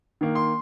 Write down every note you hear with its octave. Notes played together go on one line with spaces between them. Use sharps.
D#3 A#3
C6